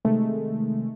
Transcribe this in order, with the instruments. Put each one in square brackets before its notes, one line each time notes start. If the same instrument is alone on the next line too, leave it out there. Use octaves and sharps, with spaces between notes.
[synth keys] C3 D#3 G#3 A3